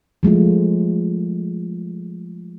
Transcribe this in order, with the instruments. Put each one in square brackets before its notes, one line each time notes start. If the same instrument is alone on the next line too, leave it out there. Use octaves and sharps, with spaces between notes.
[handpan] F3 G#3 A3 F4